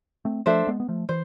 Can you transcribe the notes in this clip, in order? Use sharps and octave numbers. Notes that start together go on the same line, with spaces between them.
A3 C4
F3 A3 D4 A4 C5 E5
G#3 B3
B3
F3 A3
E3 C5